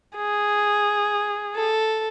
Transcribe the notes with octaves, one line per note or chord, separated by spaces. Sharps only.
G#4
A4